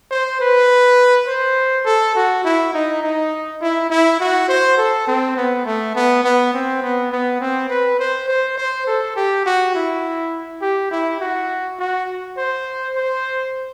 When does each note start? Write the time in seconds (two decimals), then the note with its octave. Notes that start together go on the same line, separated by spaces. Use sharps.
0.11 C5
0.41 B4
1.27 C5
1.85 A4
2.15 F#4
2.44 E4
2.74 D#4
3.02 D#4
3.61 E4
3.90 E4
4.20 F#4
4.48 C5
4.78 A4
5.07 C4
5.37 B3
5.65 A3
5.95 B3
6.24 B3
6.54 C4
6.82 B3
7.12 B3
7.41 C4
7.69 B4
7.99 C5
8.28 C5
8.57 C5
8.87 A4
9.16 G4
9.46 F#4
9.75 E4
10.62 G4
10.91 E4
11.20 F#4
11.79 F#4
12.38 C5
12.96 C5